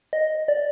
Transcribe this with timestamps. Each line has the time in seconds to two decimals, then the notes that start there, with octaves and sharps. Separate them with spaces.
0.13 D#5
0.48 D5